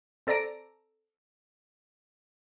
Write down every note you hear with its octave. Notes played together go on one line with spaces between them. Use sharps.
C4 A4 D5 A#5 A#6 D7